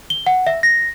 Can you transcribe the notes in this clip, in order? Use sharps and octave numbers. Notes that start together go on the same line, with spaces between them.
G7
F#5
E5
A#6